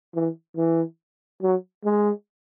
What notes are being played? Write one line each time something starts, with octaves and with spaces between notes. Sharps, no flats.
E3
E3
F#3
G#3